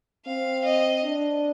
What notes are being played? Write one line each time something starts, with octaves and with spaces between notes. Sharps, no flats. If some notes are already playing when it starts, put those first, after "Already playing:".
C4 F5
D#5
D4